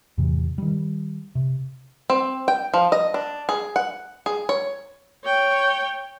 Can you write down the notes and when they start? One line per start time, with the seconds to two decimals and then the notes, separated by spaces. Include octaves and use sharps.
0.18 E2 A2 C3 E3
0.58 D#3 G3
1.35 C3
2.10 C4
2.48 G5
2.74 F3
2.92 D#5
3.14 D4
3.49 G#4
3.76 F#5
4.26 G#4
4.49 C#5
5.24 C#5 G5